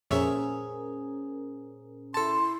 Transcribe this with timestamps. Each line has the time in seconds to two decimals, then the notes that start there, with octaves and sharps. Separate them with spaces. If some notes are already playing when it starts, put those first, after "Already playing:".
0.11 F2 A#2 C#4 G#4 A#4 C5 C#5 E5
2.14 E4 A4 A5 C6